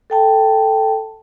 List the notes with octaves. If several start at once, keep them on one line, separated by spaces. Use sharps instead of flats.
A4 G5 A5